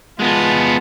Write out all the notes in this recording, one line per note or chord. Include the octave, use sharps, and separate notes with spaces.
G#3 B3 F4 A5